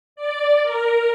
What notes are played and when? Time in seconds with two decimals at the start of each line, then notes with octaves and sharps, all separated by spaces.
0.16 D5
0.63 A#4